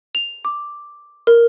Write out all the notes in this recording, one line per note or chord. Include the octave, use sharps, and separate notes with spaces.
F7
D6
A#4